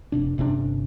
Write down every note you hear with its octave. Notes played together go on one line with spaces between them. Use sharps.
F1 C3 D4
G1 C3 C#4 D4